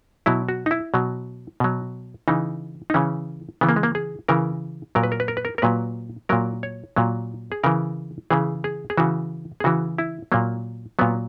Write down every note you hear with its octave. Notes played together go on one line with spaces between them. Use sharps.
B2 F#3 E4
F#4
D#4
E4
B2 F#3
B2 F#3
C#3 E3 D#4
D#4
C#3 E3 C#4
C#3 E3 B3
A#3
G#3
A#3
G#4
C#3 E3 A#4
A#2 F#3 A#4
B4
A#4
B4
A#4
B4
A#4
A#4
A#2 F#3 B4
A#2 F#3 A#4
C#5
A#2 F#3
G#4
C#3 E3 A#4
C#3 E3 G#4
G#4
G#4
C#3 E3 F#4
G#4
C#3 E3 F#4
E4
A#2 F#3 A#3
A#2 F#3 B3